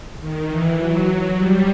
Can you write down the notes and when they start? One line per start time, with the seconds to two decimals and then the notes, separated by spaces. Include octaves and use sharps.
0.20 D#3
0.49 E3
0.78 F#3
1.36 G3